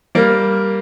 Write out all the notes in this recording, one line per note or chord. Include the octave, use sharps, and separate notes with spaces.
G3 A#3